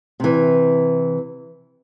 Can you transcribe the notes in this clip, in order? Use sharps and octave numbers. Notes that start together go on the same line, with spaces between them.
C3 E3